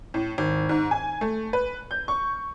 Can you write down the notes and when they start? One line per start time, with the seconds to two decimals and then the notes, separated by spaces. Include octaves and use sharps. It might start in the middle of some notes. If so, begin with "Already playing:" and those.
0.14 A2
0.38 G#1
0.69 G#2
0.91 G#5
1.21 A3
1.53 B4
1.91 G6
2.08 C#6